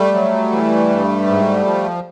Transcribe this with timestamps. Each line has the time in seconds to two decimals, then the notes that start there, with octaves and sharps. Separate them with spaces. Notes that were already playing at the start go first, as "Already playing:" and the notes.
Already playing: G3 A3
0.14 F#3
0.51 E3
0.90 G2
1.27 G#2
1.65 F3